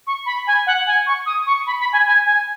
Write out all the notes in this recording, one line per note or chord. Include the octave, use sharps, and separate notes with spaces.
C#6
B5
G#5
F#5
G#5
C#6
D#6
C#6
B5
B5
G#5
G#5
G#5